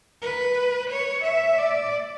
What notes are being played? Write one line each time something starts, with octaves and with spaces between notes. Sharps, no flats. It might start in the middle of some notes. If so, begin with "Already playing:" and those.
B4
C#5
E5
D5